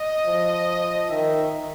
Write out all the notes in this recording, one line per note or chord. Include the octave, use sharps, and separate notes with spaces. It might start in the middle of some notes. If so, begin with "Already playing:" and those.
Already playing: D#5
F3
D#3 E5